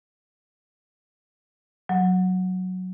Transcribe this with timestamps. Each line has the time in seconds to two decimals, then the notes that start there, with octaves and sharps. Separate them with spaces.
1.89 F#3